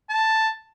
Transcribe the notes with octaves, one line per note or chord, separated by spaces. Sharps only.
A5